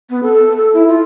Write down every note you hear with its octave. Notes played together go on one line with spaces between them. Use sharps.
B3
A4
A4
E4
F4